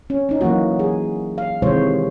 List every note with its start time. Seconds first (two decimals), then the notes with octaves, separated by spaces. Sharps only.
0.10 C#4
0.29 C#4 D#4
0.41 E3 F#3 A#3 F#4
0.79 G#4
1.38 F5
1.62 C3 D#3 E3 G#3 C5 C#5